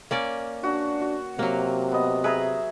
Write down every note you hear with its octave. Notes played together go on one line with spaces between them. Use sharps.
A#3 C#4 D5
D4 F#4
F#4
C3 F#3 A#3
B3 D#5
G#4 B4 E5 A#5